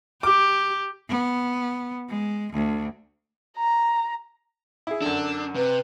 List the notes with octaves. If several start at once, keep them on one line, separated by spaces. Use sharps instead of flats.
G4 D6
B3
G#3
D2
A#5
E4 G#4
F#2 D3 D4 E6
C3 B4